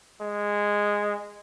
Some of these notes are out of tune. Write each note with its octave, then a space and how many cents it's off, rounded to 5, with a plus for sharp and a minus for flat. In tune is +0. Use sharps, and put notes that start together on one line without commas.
G#3 -10